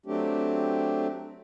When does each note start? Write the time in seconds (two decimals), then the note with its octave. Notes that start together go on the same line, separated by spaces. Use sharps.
0.06 F#3 A3 C4 D4 G4